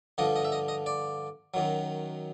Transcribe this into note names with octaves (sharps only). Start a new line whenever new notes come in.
G2 D3 F3 D#5
D#5
E5
D#5
D#5
D5
F#2 D#3 F#3